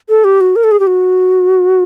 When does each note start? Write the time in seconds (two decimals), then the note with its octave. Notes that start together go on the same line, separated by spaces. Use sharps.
0.09 A4
0.24 G4
0.41 F#4
0.56 A#4
0.64 A4
0.71 G#4
0.80 G4
0.87 F#4